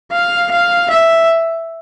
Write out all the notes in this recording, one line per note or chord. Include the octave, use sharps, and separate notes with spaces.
F5
F5
E5